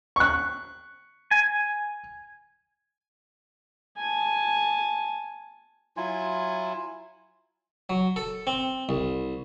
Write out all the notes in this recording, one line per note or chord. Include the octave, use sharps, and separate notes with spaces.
C#6 F#6
G#5
G#5 A5
F#3 E4 F4 G#5
F#3
A4
C4
C2